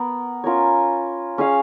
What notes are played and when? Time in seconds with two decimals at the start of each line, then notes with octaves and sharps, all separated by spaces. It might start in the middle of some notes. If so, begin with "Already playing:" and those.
Already playing: B3 A#4
0.44 C#4 F4 A#4 C#5
1.38 C#4 G#4 C#5 F5